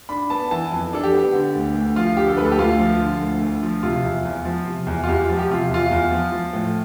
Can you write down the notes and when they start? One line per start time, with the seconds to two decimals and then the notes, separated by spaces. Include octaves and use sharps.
0.09 D4 B5
0.30 B3 A5
0.51 E3 A5
0.72 F2
0.93 D4 A4
1.04 G4
1.13 B3
1.33 D3
1.55 D2
1.75 D2
1.96 F3 F4
2.17 D3 G4
2.27 A4
2.37 D2 B4
2.45 A4
2.52 G4
2.58 D2 F4
2.79 F3
3.00 D3
3.21 D2
3.41 D2
3.63 F3
3.83 C3 F4
4.04 E2
4.25 E2
4.45 F3
4.66 C3
4.87 E2
5.04 F4
5.08 E2 G4
5.29 F3
5.39 G4
5.49 C3 F4
5.70 E2 F4
5.91 E2
6.11 F3
6.32 F3
6.53 A2